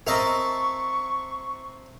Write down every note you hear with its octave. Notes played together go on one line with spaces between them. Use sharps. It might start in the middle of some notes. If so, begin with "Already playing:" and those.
C4 A#4 D#5 E5 A5 A#5 C#6 F7